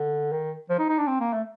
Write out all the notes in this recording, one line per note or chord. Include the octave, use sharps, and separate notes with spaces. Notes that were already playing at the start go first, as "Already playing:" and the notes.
Already playing: D3
D#3
F3
D#4
D#4
D4
C4
A#3
A3